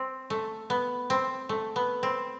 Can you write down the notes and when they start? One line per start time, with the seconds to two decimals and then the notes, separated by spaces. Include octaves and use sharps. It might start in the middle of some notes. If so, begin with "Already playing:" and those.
Already playing: C4
0.30 A3
0.70 B3
1.10 C4
1.49 A3
1.76 B3
2.03 C4